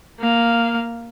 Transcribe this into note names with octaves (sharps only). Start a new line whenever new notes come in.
A#3 F5